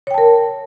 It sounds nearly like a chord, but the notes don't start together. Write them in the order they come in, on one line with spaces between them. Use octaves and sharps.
C#5 G5 A5 A#4